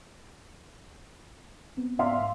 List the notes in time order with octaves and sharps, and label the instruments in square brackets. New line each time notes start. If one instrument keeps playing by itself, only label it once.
[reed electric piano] B3 C4
[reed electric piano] G#2 B3 D5 [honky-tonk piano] E5 F5 C6
[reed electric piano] G#2